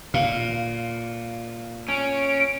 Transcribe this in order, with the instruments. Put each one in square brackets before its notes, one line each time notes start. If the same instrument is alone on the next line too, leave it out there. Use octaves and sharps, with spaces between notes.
[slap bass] A#2 [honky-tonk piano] F5
[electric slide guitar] C#4 [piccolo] D7